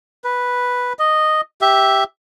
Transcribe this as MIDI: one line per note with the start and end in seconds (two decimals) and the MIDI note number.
0.24 0.93 71
0.99 1.41 75
1.61 2.04 67
1.61 2.04 76